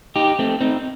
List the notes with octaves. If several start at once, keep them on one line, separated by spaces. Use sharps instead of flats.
D#4 G4
A3 C4
C4 D#4